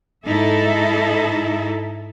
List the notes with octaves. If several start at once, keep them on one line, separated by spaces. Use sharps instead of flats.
G#2 D#4 E4 A4 E5